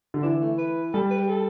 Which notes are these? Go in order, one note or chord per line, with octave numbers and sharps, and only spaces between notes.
D3
E3 D4
A3
B4
G3 A4
B4
G4
A4